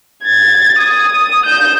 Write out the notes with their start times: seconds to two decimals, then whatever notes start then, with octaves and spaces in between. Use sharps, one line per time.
0.24 G#6 A6
0.79 D#6
1.45 G6 E7